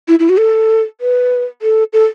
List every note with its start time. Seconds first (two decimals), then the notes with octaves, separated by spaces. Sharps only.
0.08 E4
0.19 E4
0.29 F#4
0.39 A4
1.01 B4
1.62 A4
1.93 A4